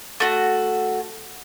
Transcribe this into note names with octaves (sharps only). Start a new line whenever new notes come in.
A3 F#4